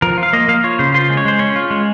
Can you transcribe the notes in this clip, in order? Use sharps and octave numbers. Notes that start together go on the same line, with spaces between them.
F3 A#4
F4
F5
A#3 D#5
A#3 F5
F4 C#5
C#3 C5
F4 C5
G#3
C#5
G#3 C5
C#4 C#5
F4
G#3